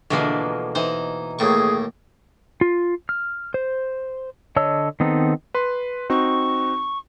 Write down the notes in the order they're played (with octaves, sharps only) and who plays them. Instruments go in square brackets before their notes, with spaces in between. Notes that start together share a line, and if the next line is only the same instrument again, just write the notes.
[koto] B2 E3 A#3 [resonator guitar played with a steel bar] D3 F3 G#3
[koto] E3 [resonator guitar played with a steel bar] D#4 [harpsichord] C5
[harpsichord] D#2 A2 C#6 [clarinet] G#4
[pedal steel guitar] F4
F6
C5
D3 C#5 D#5 A5 E6
D#3 B3 C4 D#4 A4
[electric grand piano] B4 C6
[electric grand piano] C4 D#4 F#4 [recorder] C#6